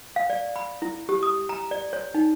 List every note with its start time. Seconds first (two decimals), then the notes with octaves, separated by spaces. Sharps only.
0.16 F5
0.30 D5
0.56 B5
0.82 E4
1.09 G4
1.23 D#6
1.49 A#5
1.71 D5
1.93 C#5
2.14 D#4